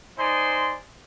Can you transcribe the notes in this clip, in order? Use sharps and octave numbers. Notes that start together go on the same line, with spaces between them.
D#4 C5 D5 G#5 C6